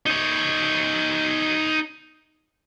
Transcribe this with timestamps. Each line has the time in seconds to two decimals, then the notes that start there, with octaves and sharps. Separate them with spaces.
0.06 D#4 C#5